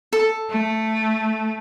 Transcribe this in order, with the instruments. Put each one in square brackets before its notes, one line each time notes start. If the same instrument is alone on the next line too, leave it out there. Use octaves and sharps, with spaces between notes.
[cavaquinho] A4
[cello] A3